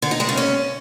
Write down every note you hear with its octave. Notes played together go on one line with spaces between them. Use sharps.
D3
D#4
G#3
C#3
C#4